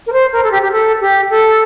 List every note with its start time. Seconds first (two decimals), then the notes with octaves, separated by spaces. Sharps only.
0.07 A#4
0.13 C5
0.32 A#4
0.44 A4
0.51 G4
0.62 G4
0.72 A4
1.01 G4
1.30 A4